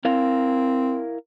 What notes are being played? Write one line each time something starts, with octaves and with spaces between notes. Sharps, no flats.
C4 E4 A#4 F5